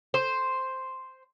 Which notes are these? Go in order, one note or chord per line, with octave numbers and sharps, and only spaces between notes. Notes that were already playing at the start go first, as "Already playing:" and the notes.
C5